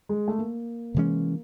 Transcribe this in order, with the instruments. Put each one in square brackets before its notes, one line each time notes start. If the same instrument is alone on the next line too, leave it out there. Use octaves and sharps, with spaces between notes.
[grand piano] G#3
A3
A#3
[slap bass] C3 E3 G#3 C#4